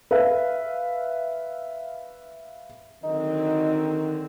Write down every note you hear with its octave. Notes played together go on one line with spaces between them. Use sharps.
B4 E5 F5
D3 D#3 F#3 C4 D#4